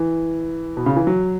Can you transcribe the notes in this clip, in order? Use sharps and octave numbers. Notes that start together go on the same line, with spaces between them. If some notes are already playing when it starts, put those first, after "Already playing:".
Already playing: E3
B2
C#3
E3
F#3